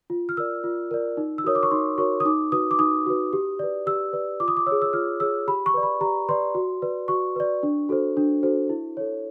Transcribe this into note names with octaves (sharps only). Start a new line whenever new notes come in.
F4
F6
A#4 D5 E6
F4
A#4 D5
D#4
E6
F#4 A#4 C#5 D#6
D6
C#6
D#4 C6
F#4 A#4 C#5 C#6
D#6
D#4 D6
F#4 B4 D#6
D6
D#4 D#6
F#4 B4
G4
B4 D5
G4 E6
B4 D5
F4 D6
D#6
D6
G#4 C#5 E6
E6
F4 F6
G#4 C#5 E6
G4 B5
C#6
B4 D5
B5
G4 A#5
B4 D5 C6
F#4
B4 D5
F#4 C#6
B4 D5
D4
F#4 A4 C5
D4
F#4 A4 C5
E4
A4 C#5